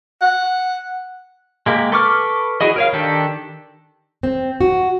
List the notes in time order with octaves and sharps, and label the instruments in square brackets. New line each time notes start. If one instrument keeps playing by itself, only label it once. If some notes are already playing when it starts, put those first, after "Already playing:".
[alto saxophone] F#5
[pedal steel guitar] G#3 A#3 G4
A4 B4 C#6 D6 F6
E4 F#4 G#4 D#5
A#4 C#5 F5
D#3 D4 G4 A4
[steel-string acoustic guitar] C4
F#4